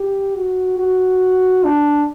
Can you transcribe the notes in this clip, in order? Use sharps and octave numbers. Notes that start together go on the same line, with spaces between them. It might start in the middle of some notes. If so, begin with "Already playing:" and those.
Already playing: G4
F#4
F#4
D4